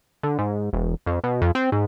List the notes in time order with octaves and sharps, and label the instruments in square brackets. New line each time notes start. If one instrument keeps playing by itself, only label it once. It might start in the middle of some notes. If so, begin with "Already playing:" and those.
[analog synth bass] D3
G#2
E1
F2
B2
F2
C4
G#2